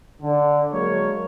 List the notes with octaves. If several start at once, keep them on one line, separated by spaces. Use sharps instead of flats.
D3
F#3 G#3 A#3 A#4 C#5